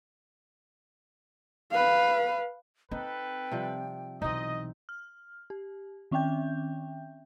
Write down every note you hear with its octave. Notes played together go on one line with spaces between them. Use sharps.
B4 F5
C4 D#4 A4 B4 G5
C3 F3 G3
B1 E3 C4 D#4 D#5
F6
G4
D#3 C4 C#4 E5 G5 G6